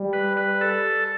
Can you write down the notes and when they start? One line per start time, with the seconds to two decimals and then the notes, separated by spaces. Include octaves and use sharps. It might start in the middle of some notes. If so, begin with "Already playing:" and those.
Already playing: G3
0.13 B4
0.37 B4
0.61 A4